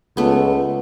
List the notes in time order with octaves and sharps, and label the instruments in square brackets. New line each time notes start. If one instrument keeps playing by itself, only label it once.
[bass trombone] C#2 [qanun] A3 B3